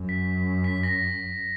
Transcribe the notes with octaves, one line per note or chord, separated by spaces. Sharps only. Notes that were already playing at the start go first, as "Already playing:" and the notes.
Already playing: F#2
B6
B6
B6
A#6